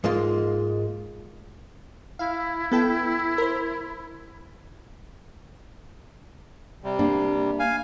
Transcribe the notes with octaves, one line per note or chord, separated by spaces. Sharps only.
G#2 G#3 A#3 F4
E4 F5
B3 A4 G5
A#4 C5
C3 G3
A#3 D4
F5 G#5